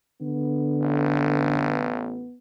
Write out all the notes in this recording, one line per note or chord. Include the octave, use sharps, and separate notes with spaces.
D3 B3
A1